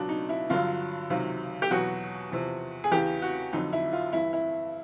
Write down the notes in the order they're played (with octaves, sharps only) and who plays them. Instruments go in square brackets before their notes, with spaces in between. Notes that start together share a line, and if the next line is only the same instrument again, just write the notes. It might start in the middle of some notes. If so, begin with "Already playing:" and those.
Already playing: [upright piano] C#2 B2 F#3 D4
D#4
E4
G2 D3 F#3 F4
C#2 C3 D#3 F#3
G4
E2 B2 F#3 F#4
E2 C3 F3
G#4
E2 C#3 E3 G4
F#4
F2 D3 F#3 D#4
E4
F4
G2 E3 E4
E4